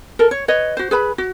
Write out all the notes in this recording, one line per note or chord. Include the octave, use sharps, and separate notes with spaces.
A4 A#4
C#5
B4 C#5 D#5
F#4 C5
G#4 B4 B5
F#4